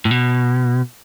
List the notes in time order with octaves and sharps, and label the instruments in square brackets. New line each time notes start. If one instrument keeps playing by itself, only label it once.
[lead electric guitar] A2
B2